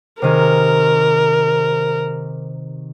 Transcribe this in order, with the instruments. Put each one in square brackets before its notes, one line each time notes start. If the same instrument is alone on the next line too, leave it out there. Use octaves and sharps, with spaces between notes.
[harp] C3 D#3 G#4 [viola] A#4